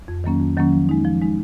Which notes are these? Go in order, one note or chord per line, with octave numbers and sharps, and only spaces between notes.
F2
D#3 F#3 A#3 C#4
F2
D#3 F#3 A#3 C#4
F3
G#3 D#4
F3
G#3 D#4